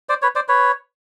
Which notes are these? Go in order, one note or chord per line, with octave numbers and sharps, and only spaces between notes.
C5 D5
B4 C#5
C5 D5
B4 C#5